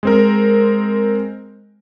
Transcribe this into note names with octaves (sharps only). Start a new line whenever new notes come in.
G#3 C4 A#4